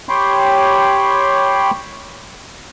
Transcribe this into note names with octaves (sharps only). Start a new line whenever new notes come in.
G4 C#5 G5 B5 C6